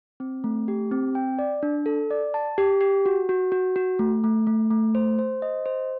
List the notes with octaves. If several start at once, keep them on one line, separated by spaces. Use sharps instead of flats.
C4
A3
G4
C4
G5
D5
D4
A4
D5
A5
G4
G4
F#4
F#4
F#4
F#4
A3
A3
A3
A3
C5
C5
D#5
C5